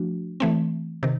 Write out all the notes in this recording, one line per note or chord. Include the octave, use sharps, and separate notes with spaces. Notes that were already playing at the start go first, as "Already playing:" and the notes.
Already playing: F3 A3 D4 F#4
E3 A3 C4
C3 D#3